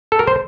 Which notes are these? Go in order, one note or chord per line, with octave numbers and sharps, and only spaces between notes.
A4
A#4
C5